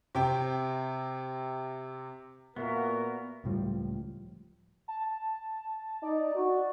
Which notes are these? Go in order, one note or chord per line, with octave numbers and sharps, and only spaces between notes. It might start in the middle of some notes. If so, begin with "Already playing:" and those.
C3 G5
A#2 B3 F#4 A#4 E5 F5
C#2 A2 F3 G3
A5
D#4 D5
F#4